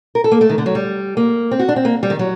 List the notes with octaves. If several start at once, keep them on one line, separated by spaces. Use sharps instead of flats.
A#4
A4
A#3
A3
D#3
D3
F#3
G3
A#3
C4
F#4
D4
C4
A#3
G3
D#3
F#3